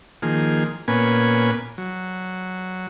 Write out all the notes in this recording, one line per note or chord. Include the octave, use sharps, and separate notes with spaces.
D#3 F3 A#3 G#4 F6
A#2 A#3 B3 C#4 B4 G#5
F#3